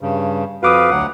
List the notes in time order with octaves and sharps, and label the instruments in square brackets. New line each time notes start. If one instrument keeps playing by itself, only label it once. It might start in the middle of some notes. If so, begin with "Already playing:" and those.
[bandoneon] G2 C#3
[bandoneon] F2 B4 F5 [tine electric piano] F#4 D6 D#6
[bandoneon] D2 F#3 F#5